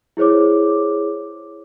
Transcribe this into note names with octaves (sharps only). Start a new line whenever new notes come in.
E4 G#4 C5 C#5 D6